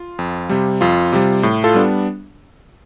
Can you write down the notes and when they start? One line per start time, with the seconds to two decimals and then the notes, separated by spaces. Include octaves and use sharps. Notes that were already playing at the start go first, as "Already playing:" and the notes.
Already playing: F4
0.19 F2
0.49 C3 G3
0.81 F2 F4
1.13 C3 G3
1.43 A2
1.64 F4 A4
1.74 G3 B3 D4